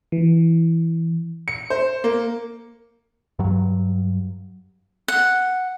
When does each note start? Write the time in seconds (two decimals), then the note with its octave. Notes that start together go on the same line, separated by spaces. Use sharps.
0.12 E3
1.48 C#7
1.70 C5
2.04 A#3
3.39 G2 F#3
5.08 F#5